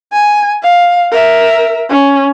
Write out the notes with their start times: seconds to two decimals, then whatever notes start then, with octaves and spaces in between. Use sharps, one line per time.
0.12 G#5
0.62 F5
1.12 A#4 E5
1.90 C#4